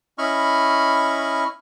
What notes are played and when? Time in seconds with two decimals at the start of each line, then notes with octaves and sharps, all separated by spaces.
0.18 C#4 E4 D#5 B5 C#6 F6